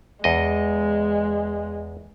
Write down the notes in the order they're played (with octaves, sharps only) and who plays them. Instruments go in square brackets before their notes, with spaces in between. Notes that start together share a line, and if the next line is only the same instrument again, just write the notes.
[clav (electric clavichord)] E2 D#5 [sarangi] G#3